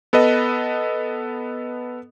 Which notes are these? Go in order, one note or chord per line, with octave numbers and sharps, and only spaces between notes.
B3 A4 B4 D#5